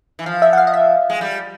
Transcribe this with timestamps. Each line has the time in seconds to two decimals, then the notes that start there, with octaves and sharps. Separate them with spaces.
0.19 E3
0.26 F3 F5
0.42 E5
0.53 F#5
0.58 F5
0.67 D#5
0.74 E5
1.10 G#3
1.21 G3